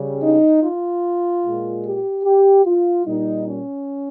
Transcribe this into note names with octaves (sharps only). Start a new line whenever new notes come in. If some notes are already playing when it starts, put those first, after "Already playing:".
Already playing: C#3 G3
D#4
F4
A#2 G#3
G4
G4
F4
A#2 G3 D#4
C#4